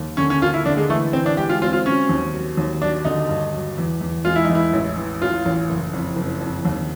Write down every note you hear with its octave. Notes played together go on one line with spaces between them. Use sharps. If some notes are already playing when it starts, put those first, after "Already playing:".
Already playing: D#2 A#3
D3 C#4
C#4
A#3 F4
E4
D3 D4
G#3
E3 A3
E3 C4
D4
G#3 G4
F4
C4 F4
F4
F#3 C#4
D#2
F#3
D#2
F#3 D4
D3 D#4
G2
F#3
E2
E2
G#3 F4
E4
D#4
E2
E4
A1
E3
A1 F4
A1
F#1
F2
F#1
F2
D#2